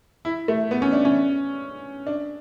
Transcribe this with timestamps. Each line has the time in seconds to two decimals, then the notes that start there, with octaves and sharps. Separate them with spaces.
0.25 E4
0.48 A3
0.71 B3
0.82 C#4
0.92 D4
1.05 C#4
2.07 D4